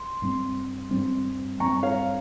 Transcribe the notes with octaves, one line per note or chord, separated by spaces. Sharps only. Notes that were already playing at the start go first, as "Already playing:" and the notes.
Already playing: C6
G2 G3 C4
G2 G3 C4
G2 G3 C4 A#5 C#6
C#5 F5